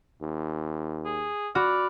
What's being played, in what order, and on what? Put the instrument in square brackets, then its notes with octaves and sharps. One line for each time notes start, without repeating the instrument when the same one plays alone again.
[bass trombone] D#2
[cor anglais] G#4
[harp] F#4 [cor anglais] D5 [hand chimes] B5 F6